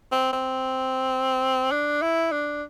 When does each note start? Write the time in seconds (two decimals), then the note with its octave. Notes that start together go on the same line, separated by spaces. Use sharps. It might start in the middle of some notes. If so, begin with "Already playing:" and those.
0.12 C4
0.32 C4
1.71 D4
2.02 E4
2.32 D4